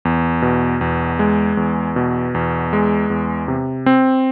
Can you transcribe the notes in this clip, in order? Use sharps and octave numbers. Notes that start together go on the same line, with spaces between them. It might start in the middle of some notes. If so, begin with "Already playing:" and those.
E2
B2
E2
G#3
E2
B2
E2
G#3
E2
C3
C4